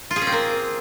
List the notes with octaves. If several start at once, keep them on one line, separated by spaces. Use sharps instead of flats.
F4
G#4
C#4
C4
A#3